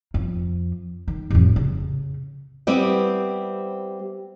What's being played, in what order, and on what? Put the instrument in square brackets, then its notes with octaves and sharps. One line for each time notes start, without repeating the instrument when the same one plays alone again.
[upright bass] F2
D#3
A1 F2
C#3
[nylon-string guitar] G3 B3 C4 E4 G4